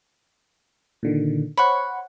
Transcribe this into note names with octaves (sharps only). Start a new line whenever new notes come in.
A#2 D3 D#3
C5 C#5 F#5 B5 C#6